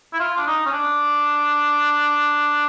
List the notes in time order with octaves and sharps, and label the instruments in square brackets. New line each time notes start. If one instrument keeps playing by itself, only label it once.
[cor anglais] E4
F4
D4
D#4
C#4
D4